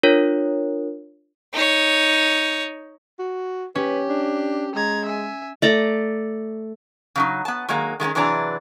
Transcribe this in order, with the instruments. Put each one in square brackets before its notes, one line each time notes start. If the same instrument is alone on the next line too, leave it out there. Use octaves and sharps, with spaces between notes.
[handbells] D4 F4 A#4 C#5
[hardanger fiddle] D#4 C#5
[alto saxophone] F#4
[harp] C#4 [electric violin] G4 [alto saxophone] B4
[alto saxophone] D4
[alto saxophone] G#3 [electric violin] A#5 G#6
[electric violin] E5 G#5
[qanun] A3 D5 A#5
[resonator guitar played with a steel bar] C#3 F#3 D#4
B3 A5
D#3 F#3 G#3 A#3
D#3 G#3 A#3 C#4
C3 E3 F#3 D4 G#4 A#5